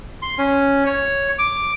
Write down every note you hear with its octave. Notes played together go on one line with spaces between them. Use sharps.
C6
C#4
C#5
D6